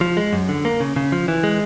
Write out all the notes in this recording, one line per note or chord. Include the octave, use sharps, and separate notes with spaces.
F3
G#3
F#2
D3
A#3
C#3
C#3
F3
E3
G#3